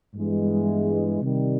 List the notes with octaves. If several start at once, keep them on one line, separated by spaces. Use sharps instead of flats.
G2 E3 G#3 B3
C3 D#3 G3